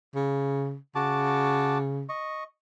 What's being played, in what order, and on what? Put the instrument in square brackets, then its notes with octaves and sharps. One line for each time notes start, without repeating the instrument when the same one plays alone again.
[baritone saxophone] C#3
[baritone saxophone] C#3 [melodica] F#4 A5 D6
[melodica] D#5 C#6